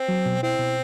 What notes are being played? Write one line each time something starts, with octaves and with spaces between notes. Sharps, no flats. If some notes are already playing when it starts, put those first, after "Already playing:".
Already playing: C4
F#3
B2
C4 E4
B2